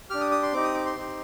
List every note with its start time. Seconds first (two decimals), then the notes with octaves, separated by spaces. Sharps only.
0.10 D4 G4 F6
0.21 D#6
0.31 D#6
0.43 C6
0.53 C4 D#4 G4 D6
0.64 D#6
0.74 D6
0.86 C6
0.96 C4 D#4 G4